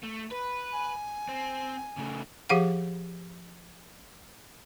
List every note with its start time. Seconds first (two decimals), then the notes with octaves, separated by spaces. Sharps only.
0.04 A3
0.32 B4
0.73 G#5
1.29 C4
1.98 C#3 A3
2.49 F3 G4 G#4 F5 F#5